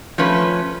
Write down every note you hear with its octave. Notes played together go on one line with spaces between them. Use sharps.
F3 A3 C#4 B4